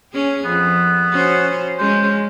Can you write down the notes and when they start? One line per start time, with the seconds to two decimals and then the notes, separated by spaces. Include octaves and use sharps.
0.13 C#4 G#4
0.45 F2 B3
1.11 C#4 F#4 C5
1.79 G#3 C#4 C5